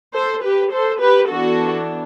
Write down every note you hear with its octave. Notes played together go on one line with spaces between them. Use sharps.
A4 C5
G4 B4
A4 C5
G4 B4
E3 B3 D4 F#4 A4